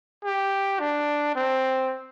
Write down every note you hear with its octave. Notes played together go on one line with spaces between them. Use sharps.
G4
D4
C4